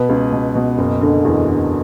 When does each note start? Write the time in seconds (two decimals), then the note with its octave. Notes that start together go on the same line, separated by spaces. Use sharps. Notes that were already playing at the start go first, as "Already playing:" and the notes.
Already playing: B2 B4
0.09 C#2
0.32 B2
0.55 B2
0.78 F#1
1.01 D3
1.25 E2
1.47 D3